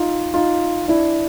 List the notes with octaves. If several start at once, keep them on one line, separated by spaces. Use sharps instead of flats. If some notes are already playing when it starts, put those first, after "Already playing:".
Already playing: D#4 F4
D#4 F4
D4 E4